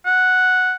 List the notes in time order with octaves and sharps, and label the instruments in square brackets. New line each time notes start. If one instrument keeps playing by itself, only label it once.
[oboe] F#5